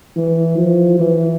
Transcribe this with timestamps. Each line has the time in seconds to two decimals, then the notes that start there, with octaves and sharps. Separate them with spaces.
0.16 E3
0.57 F3
1.00 E3